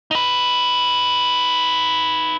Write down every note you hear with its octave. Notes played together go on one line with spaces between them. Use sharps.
D#4 B4